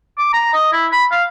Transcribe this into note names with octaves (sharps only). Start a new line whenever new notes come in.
D6
A#5
D#5
E4
B5
F5